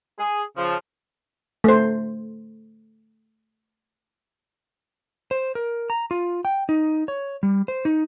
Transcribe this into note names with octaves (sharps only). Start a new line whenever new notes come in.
G#4
C#3 F3
A3 C5
C5
A#4
A#5
F4
G5
D#4
C#5
G3
C5
D#4